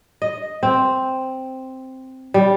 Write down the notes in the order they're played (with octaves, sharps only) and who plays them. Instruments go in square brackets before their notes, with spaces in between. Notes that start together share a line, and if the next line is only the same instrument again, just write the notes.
[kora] D#5
C4
G3